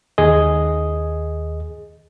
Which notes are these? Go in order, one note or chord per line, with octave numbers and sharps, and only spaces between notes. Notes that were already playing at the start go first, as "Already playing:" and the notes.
D#2 G#4 D#5